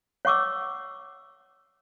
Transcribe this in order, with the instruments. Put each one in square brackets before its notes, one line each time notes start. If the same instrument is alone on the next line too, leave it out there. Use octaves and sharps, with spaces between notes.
[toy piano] C#5 F#5 C#6 D6 E6